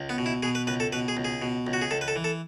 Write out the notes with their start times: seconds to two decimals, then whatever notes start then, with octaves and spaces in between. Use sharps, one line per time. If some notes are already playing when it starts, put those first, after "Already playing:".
Already playing: C#2
0.09 B3
0.18 B2
0.26 E4
0.43 B2 G#4
0.55 B4
0.67 C#2 B4
0.80 A4
0.92 B2 B4
1.08 G#4
1.17 C#2
1.24 G#4
1.42 B2
1.67 C#2
1.73 F#4
1.81 G#4
1.91 C#2 A4
2.01 B4
2.08 A4
2.16 E3
2.24 A4